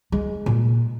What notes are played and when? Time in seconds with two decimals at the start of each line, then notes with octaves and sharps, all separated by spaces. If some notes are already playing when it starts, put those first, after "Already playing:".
0.12 G#3
0.46 A#2